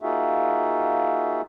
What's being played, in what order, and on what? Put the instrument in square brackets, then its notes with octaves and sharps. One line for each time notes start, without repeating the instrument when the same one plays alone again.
[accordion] A#3 D#4 F4 F#4 G#4 E5